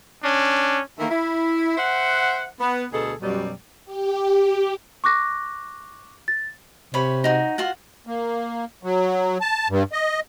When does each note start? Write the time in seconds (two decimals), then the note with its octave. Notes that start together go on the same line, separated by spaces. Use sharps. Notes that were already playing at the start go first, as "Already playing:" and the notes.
0.24 C#4 D4
0.99 D#3 E3 A3 A#3 A#4
1.10 E4
1.77 C5 E5 F#5
2.61 B3
2.92 D2 B2 G#4 A4
3.21 F#2 B2 F#3 G3
3.85 G4
5.04 C#6 D6 F#6 A#6
6.28 A6
6.94 C3 C#5 B5
7.24 D#4 F#4
7.58 F4 F#4 F#5
8.07 A#3
8.83 F#3
9.41 A5
9.69 G2
9.92 D#5